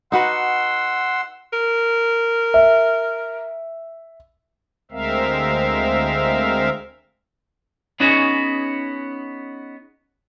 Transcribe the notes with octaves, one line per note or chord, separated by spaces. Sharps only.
D#4 F#4 B4 F#5 C6 E6
A#4
E5
D2 G#3 C4 A#4 E5 F5
B3 C#4 D#4 F#4 G#4 C#5